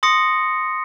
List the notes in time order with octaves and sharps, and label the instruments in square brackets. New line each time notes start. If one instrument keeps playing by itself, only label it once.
[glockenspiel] C6 D#6 A#6 C#7